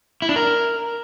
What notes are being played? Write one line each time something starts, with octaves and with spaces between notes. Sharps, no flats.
E4
D4
A#4